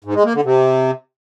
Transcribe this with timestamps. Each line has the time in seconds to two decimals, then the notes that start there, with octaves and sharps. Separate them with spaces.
0.04 G#2
0.14 G#3
0.24 A#3
0.34 D3
0.45 C3